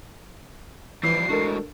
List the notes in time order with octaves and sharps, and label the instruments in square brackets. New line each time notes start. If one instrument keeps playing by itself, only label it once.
[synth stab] E3 [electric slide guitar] F3 G3 E4 [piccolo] C7
[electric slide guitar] A2 G#3 F#4 [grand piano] D4 A4 A#4